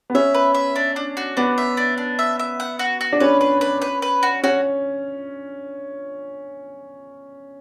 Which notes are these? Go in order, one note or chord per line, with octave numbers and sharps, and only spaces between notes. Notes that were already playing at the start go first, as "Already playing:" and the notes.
B3
C#4 E5
B4
E5
D4
D4
F#4
B3 D4
E5
D4
D4
E5
E5
F#5
F#4
F#4
D4
C#4 B4
B4
B4
B4
B4
F#4
C#4 F#4